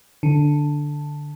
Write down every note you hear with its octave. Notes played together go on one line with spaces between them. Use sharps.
D3